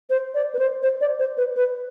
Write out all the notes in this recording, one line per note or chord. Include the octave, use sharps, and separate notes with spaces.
C5
D5
B4
C5
C5
D5
C5
B4
B4